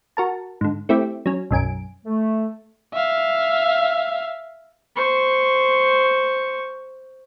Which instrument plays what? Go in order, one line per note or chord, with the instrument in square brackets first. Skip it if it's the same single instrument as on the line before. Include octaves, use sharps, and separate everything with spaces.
[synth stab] F#4 A#4 A5
G#2 D3
A3 C4 E4 G4
F#3 C#4
B1 F#2 G#5 D7
[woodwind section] A3
[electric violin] E5 F5
[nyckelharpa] C5 C#6